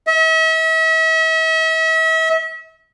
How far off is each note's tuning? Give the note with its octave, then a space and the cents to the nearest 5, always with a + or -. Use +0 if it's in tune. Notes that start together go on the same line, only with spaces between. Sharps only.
E5 -40